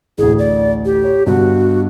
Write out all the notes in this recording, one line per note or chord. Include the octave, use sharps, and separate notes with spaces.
A1 D2 G#4
D5
G4
C#5
G2 B2 D3 F#4